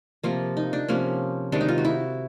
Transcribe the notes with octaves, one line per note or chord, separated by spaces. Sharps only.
C3 F3 A#3 F4
D#4
D4
C3 F3 A#3 C#4
C3 D#3 G#3 D4
D#4
F4
F#4
E4